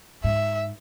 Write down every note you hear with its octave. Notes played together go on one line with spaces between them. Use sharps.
G#2 E5